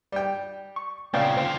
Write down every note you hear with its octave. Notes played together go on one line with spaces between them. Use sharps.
G3 G5
C#6
A#2 C#3 B3 C4 D5 G5
D3 F4 C5 G5